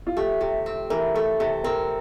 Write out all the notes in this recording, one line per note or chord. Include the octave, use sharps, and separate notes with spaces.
F4
A3 G4
C3 G4
C4
E3 A#4
A3 A4
C3 A4
C4 A#4